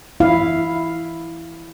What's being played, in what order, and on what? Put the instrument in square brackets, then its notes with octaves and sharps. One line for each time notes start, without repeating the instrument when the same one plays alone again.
[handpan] E4 F5